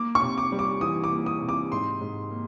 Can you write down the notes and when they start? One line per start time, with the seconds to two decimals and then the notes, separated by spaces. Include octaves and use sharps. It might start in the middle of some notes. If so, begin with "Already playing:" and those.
Already playing: A#3 D6
0.15 C#6
0.21 C3
0.38 D6
0.52 G3
0.59 D6
0.81 E3 D#6
1.04 D6
1.11 A#3
1.26 D#6
1.42 C3
1.49 D6
1.72 G#2 C6
2.01 G#2
2.31 A#3